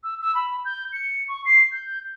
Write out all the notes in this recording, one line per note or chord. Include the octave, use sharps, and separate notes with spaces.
E6
E6
B5
G6
C#7
C#6
C7
G6